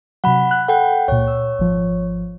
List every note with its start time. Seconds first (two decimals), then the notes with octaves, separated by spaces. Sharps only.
0.24 C3 F#3 F#5 B5
0.51 F#6
0.68 A4 F#5 G5
1.08 C#2 A#2 C#5
1.27 E6
1.59 G#1 F3